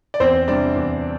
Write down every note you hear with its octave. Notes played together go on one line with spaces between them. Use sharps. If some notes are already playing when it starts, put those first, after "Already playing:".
D5
E2 C4 C5
C3 G3 D4 D5
E2